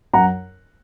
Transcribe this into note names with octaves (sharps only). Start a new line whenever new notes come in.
F#2 F#5 A#5